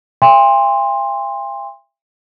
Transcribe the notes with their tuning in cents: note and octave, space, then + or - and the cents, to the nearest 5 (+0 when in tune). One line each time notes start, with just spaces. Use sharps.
E5 +45 G5 +45 C6 +5